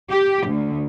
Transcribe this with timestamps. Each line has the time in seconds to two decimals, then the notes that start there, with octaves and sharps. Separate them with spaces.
0.11 G4
0.47 D2